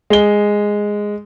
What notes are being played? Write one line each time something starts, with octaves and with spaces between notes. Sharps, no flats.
G#3 G7